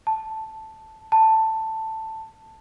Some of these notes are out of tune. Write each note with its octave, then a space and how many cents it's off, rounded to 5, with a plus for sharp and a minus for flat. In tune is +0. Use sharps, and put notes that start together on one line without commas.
A5 +0
A5 +10